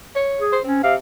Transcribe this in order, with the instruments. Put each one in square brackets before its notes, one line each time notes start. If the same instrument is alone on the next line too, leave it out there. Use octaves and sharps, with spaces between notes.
[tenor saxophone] C#5
[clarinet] G#4
[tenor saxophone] C5
[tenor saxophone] C4 [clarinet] C#4
[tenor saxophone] C3 [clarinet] F5